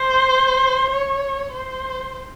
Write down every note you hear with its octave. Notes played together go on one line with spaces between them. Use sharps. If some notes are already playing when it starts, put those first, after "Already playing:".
Already playing: C5
C#5
C5